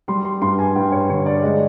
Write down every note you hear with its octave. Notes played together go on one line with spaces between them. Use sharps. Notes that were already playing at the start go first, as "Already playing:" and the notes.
G3 C6
C6
G2 C6
G#5
G2 G5
C#5
D3 C#5
D5
G#3 D#5